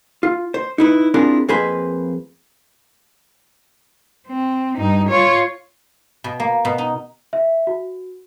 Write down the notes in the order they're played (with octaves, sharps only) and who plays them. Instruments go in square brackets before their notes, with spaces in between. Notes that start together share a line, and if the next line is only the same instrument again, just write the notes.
[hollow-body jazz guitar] F4
C5
D#4 E4 B4
C4 D4 E4 F4 G#4 A#4
F2 A#3 G#4 B4 C5 B5
[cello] C4
G2 D#4
F4 C#5
[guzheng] B2
A#3
B2
D#4
[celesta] E5
F#4